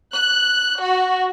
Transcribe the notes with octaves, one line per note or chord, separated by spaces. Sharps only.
F#6
F#4